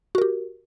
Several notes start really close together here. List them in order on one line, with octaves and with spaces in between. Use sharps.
F#4 A#4 G4